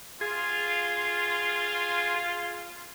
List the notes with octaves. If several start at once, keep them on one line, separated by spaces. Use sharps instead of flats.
F4 G#4